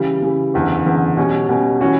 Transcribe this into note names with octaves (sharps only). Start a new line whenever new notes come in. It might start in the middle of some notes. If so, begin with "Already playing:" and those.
Already playing: C#3 E3 G3
C#3 E3 G3
F#1 E2 D3
F#1 E2 D3
B2 G3 C#4
B2 G3 C#4
E3 G3 C#4 F#4